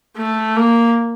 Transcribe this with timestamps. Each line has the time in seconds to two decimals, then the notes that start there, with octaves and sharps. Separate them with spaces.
0.17 A3
0.56 A#3